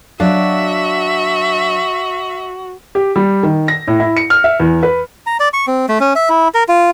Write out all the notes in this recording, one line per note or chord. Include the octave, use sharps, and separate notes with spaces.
F#3 D4 F#4 E5 F5
G4
G3
D#3
A#6
A2
E4
C#7
F6
E5
E2
B4
A#5
D5
C#6
C4
A3
C#4
E5
E4
A#4
F4